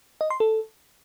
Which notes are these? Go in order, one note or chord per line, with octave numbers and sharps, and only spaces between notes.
D#5
C6
A4